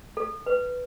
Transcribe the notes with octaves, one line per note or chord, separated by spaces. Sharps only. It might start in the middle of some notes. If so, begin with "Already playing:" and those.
A4
B4